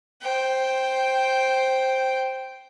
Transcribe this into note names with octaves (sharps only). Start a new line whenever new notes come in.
C5 G5